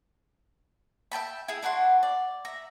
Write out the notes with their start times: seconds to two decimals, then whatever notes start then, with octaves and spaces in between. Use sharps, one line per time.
1.12 E5 G5 A5 B5
1.48 E4 G#4
1.63 D4 E4 F#4 C6
2.03 D5
2.45 E5 A#5